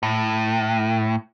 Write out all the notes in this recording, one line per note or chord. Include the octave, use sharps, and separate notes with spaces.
A2